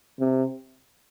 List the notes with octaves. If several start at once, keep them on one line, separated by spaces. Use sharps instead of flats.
C3